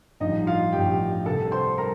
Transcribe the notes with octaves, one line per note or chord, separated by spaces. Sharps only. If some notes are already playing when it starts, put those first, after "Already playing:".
A1 G2 F3 D#4 D#5
F4 F5
A1 G2 F3 G4 G5
C2 C3 G3 A4 A5
C5 C6
G3 A#4 A#5